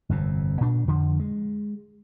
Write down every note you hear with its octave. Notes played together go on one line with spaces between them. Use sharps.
G1 F2 C3
A#2 D4
F2 D3 F3
G#3